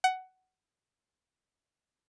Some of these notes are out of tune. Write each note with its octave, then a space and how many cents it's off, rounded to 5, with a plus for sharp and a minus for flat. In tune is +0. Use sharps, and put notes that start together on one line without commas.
F#5 +15